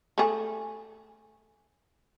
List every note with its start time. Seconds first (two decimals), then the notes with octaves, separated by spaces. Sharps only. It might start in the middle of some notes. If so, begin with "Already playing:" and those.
0.18 A3 G#4